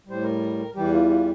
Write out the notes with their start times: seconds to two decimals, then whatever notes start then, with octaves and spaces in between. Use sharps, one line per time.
0.07 A2 G3 C5
0.23 A#4
0.75 E2 E3 G3 G4
0.93 F4
1.10 F4